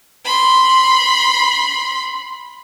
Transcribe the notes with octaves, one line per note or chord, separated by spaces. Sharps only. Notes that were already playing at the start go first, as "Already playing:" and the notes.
B5 C6